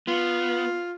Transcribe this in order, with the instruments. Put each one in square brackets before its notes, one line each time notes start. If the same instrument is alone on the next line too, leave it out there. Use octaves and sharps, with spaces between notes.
[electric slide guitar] B3 [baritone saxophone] F4